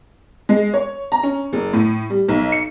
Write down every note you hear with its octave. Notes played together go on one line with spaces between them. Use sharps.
G#3
C#5
A#5
C#4
F#1
A2
G3
B1
C#7